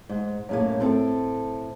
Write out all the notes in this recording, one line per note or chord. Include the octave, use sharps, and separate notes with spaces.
G#2
F#2 A2 A#3
A2 C4 A4